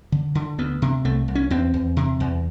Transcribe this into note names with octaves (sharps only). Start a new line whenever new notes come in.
D3
D3
D2 B3
C3
C2 A3
C2
C#4
E2 C4
E2
C3
E2